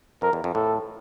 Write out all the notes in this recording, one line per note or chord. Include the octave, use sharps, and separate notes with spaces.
F2 A#4
E2
F2
A2 A4